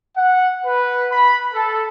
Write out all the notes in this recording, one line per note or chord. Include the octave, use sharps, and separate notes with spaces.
F#5
B4
B5
A4